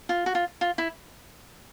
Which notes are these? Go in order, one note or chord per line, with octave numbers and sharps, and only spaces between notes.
F4
F#4
F4
F4
E4